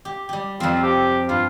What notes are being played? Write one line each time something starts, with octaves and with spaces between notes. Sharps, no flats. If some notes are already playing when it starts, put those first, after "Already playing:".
G4
G3 G4
F2 F3 C4
G4
G2 F4